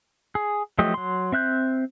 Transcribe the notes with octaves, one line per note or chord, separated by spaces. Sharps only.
G#4
F3 F#3 A3 G4 D#5
F#3 C6
C4 E5 F#6 G6